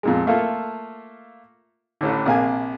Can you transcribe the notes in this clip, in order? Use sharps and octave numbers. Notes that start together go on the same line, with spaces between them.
F2 A#2 G#3
A3 A#3 F4 A4
A1 A2 D3
A#1 C3 A#3 G#4 G#5